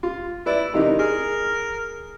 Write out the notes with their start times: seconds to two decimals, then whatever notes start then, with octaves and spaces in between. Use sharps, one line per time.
0.03 F4
0.46 E4 B4 D5
0.74 C3 D#3 E3 D#4
0.99 G#4 A#4